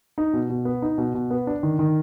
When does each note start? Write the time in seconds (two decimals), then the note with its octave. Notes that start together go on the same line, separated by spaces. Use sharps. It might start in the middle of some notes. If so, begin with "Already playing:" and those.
0.18 D#4
0.33 B2
0.50 B2
0.65 B3
0.82 D#4
0.98 B2
1.14 B2
1.30 B3
1.47 D4
1.63 D#3
1.79 D#3